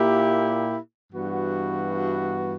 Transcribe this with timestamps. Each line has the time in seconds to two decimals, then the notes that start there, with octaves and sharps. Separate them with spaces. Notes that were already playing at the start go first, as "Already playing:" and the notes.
Already playing: A#2 A#3 E4 G4
1.12 G2 E3 B3 F#4